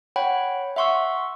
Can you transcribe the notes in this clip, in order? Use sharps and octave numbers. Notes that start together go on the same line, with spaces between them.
C#5 F#5 G5 B5
E5 F#5 C6 C#6 E6